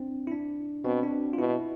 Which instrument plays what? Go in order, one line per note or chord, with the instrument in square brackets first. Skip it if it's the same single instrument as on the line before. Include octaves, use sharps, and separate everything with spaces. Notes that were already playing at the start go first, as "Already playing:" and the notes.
Already playing: [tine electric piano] C4 D4
E4
D4
[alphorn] B2 [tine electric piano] C4
[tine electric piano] D4
F4
[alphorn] B2 [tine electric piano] E4